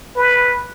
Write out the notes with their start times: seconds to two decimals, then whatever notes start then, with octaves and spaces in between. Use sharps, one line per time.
0.16 B4